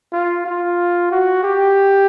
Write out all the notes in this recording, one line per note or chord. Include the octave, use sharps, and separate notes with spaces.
F4
F4
F#4
G4